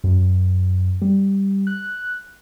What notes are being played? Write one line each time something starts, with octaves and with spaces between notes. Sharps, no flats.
F#2
G3
F#6